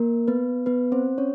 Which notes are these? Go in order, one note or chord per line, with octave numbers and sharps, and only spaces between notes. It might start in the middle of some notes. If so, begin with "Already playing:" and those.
Already playing: A#3 A#4
B3 B4
B3 B4
C4 C5
C#4 C#5